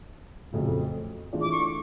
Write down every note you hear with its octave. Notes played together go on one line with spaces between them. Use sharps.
F2 C#3 F#3 A3
E3 A3 D4 F4 G#4
D6
C#6